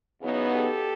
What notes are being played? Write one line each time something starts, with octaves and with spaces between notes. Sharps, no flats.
E2 C#3 F#3 B3 D#4
G4 A4